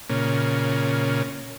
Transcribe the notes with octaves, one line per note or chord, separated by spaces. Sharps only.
A#2 C#3